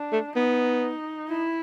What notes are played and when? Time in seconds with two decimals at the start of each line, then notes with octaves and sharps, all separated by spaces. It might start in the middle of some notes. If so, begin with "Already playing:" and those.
Already playing: D4
0.12 A3
0.36 B3 D#4
1.30 E4